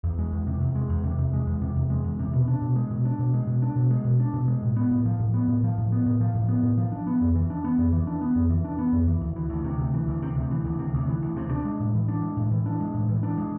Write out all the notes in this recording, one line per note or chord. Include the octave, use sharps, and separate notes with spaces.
E2
G#3
E2
C3
E2
G#3
E2
C3
E2
G#3
E2
C3
E2
G#3
E2
C3
B2
D4
B2
G#3
B2
D4
B2
G#3
B2
D4
B2
G#3
B2
D4
B2
G#3
A2
B3
A2
F3
A2
B3
A2
F3
A2
B3
A2
F3
A2
B3
A2
F3
D4
B3
F2
E3
D4
B3
F2
E3
D4
B3
F2
E3
D4
B3
F2
E3
D2
E3
D2
C3
D2
E3
D2
C3
D2
E3
D2
C3
D2
E3
D2
C3
D4
G#3
A2
E3
D4
G#3
A2
E3
D4
G#3
A2
E3
D4
G#3